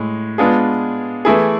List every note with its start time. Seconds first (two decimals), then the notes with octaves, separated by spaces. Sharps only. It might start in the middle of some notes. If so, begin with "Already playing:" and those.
Already playing: A2 G#3
0.38 G#3 B3 D4 F4 G#4
1.25 E3 A3 E4 G#4